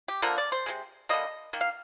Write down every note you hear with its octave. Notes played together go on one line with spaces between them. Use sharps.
G4
D3 F3 A#3 A#4
D5
C5
C3 F3 G#3
D3 G3 A#3 D#5
D#3 A#3
F5